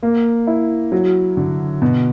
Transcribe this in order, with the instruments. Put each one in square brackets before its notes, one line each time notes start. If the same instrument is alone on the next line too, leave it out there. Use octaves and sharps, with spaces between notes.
[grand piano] A#3
E4
F#3
D3
B2